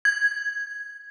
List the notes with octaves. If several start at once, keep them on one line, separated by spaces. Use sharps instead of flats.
G#6